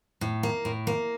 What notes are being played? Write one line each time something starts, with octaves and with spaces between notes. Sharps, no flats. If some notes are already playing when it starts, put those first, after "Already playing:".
A2
A#3
A2
A#3